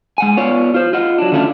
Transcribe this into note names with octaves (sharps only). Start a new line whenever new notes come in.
G#3 F#5 G#5
B3 F4 C#5 D5
F4 C5
F4 D#5 F#5
F#3 D4
D3 D#3 A3 C#4 D4 F4